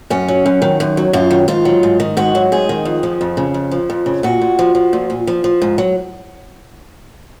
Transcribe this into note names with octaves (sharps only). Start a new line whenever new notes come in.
F#2 C#4
F#3
F#2
D#3
F#2
F#3
F#2 F4
D#3
G#2 F4
F#3
G#2
D#3
G#2 F#4
F#3
G#2 G#4
D#3
F2
F3
F2
C#3
F2
F3
F2
C#3
A#2 F#4
A#2
F3
F3
A#2
A#2
F3
F3
G#2
F#3